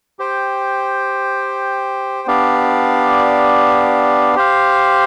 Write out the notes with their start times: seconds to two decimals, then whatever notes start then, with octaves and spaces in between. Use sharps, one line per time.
0.19 G4 C5 G5
2.27 B3 D4 G4 D5 F5
4.35 G4 C5 F5